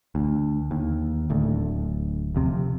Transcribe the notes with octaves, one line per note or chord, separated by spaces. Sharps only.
D2
D#2
D1 D2
F1 F2 C3